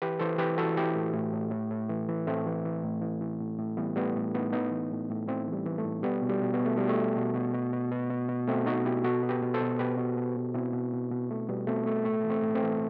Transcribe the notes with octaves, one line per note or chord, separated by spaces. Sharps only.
E3 G4 B4
E3 A4 C5
E3 G4 B4
E3 F#4 A4
E3 E4 G4
A2
A2
A2
A2
A2
E3
E3
A2 A3 C4
E3
E3
A2
E3
E3
A2
A2
E3 G3 B3
A2 G3 B3
A2
A2 B3 D#4
A2 B3 D#4
E3
A2
A2
A2 C4 E4
E3
G3
E3
A3
A2
B2 G3 B3
B2
G3
B2
B3
B2
A3
B2 G3
A3
B2
B2
B2
B2
B2
B2
B2
B2
B2 A3 C4
B2 D#4 F#4
B2 E4 G4
B2 F#4 A4
B2
G4 B4
B2
A4 C5
B2
B2 G4 B4
B2
B2
B2
B2 C4 E4
B2
B2
B2
B2 A3
B2 G3 B3
B2 A3 C4
B2 A3
A2 A3
E3
A3 C4
A2
A3 C4
E3